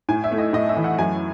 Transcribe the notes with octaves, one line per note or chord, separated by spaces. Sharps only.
A2 G#5
E5
A3
D#5
A2 D#5
E5
E3
F#5
F#2 G#5